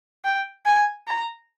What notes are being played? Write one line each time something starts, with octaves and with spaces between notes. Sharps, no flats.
G5
G#5
A#5